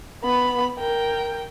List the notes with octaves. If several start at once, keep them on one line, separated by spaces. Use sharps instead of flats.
B3 B5
A#4 G5